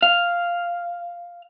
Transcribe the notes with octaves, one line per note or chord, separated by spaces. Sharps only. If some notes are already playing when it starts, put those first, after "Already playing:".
F5